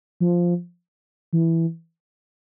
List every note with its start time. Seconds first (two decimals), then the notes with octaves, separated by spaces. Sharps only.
0.20 F3
1.33 E3